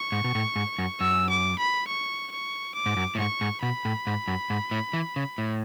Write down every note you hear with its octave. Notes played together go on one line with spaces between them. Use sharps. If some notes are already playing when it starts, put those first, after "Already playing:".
Already playing: C#6
G#2
B2
A2
G#2
F#2
F#2 E6
D6
B5
C#6
C#6
D6
G#2
F#2
A2
G#2 C#6
G#2
B2 B5
A2
G#2
F#2
G#2
A2
E3
C#3
A2